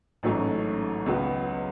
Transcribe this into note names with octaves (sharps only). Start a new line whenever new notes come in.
A1 G#2 F#3 A3 C#4
C#2 C#3 F#3 B3 F#4